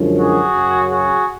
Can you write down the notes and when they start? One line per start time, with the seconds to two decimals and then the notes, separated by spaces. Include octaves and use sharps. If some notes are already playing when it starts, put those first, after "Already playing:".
Already playing: F#2 D3 F3 G#3 C#4
0.18 F#4 G#4
0.54 F#2 C#3 F#3
0.90 F#4 G#4